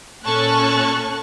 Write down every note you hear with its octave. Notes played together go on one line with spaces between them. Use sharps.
A#2 C#4 A4 A5 C#6 F#6